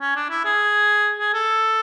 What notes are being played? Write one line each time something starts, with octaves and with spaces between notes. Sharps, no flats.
C#4
D4
E4
G#4
G#4
A4